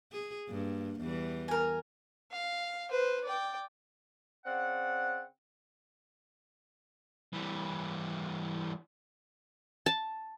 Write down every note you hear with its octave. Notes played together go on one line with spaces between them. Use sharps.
G#4
G2 A#3
E2 E3 G3
A#4 G#5
F5
B4 C5
D5 G5
C#3 C4 D5 F#5
E3 G3
A5